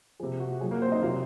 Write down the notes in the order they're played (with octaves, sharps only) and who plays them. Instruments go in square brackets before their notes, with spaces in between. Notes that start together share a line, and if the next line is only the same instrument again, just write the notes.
[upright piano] C3 F3 G#4
F#4
A#2 F#3 G#4
A#3 A#4
C4 C5
D#4 D#5
C3 F#3 F4 F5